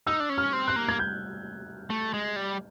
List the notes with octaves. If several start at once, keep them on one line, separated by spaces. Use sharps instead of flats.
D#4 E6
D4
C#4
F6
C4
F#6
A#3
G#6
G6
A3
G#3
G3